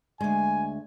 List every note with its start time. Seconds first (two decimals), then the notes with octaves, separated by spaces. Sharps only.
0.20 D2 G#3 G#5